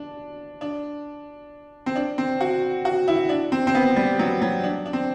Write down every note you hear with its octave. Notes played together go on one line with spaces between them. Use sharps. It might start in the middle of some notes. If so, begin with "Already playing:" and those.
Already playing: D4
D4
C4
D4
C4
F#4
F#4
E4
D4
C4
C4
B3
G3
F#3
F#3
D4
D4
C4